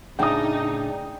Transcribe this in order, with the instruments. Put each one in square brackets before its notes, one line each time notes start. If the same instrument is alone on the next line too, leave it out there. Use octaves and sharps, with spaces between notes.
[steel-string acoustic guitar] A2 C#3 D4 [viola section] D#4 [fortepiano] G5 D#6